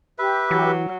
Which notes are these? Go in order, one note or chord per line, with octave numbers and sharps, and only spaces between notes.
G4 B4 E5
E3 F#3